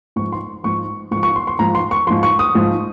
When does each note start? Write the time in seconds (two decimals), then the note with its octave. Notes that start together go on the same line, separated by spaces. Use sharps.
0.16 G#2 C#6
0.19 F3
0.32 C6
0.64 G#2 F3 C#6
1.11 G#2 C#6
1.16 F3
1.23 C#6
1.36 C6
1.47 C6
1.59 G#2 F3 A#5
1.75 C6
1.91 C#6
2.07 F3 C6
2.11 G#2
2.23 C#6
2.39 D#6
2.55 G#2 F3